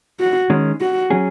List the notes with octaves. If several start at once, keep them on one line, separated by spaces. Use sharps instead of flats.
F#4
D#3 G#3 C#4
F#4
F#3 C#4 G#4